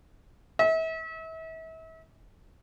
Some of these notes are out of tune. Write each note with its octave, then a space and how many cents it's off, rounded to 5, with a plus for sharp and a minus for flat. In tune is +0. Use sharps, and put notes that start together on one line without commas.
E5 -35